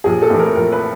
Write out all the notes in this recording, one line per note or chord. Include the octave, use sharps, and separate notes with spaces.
A#1 G#4
A4
A2 E3
A#4
A#1 A#4
B4